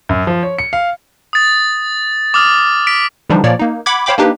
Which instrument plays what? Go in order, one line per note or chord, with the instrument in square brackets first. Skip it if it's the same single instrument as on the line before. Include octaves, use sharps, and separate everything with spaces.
[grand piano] F#2
F3
C#5
C#7
F5
[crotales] D#6 A6
D6 D#6 F6
B6 D7
[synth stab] D3 E3 F3 G3 D4 D#4
A#2 F3 A#3 C#5 D5
A#3 D#4
F#5 B5 D6 G#6
C5 C#5 F5 G5 B5 D6
A#3 D4 D#4 G4 B4